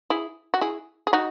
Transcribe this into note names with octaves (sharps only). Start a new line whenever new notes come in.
E4 G#4
F#4
E4 G#4
G#4
D#4 F#4